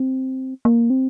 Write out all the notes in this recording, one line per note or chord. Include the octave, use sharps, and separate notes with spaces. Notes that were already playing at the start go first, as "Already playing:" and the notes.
Already playing: C4
A#3
C4